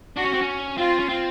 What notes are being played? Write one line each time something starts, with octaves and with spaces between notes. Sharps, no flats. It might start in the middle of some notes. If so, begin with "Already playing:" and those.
D4 F#4
C#4
C4
C#4
C4 F4
C#4
C4